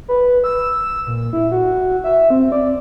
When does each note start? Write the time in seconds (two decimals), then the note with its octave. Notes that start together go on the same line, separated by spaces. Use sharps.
0.08 B4
0.44 E6
1.07 A#2
1.33 E4
1.52 F#4
2.04 E5
2.30 C4
2.52 D5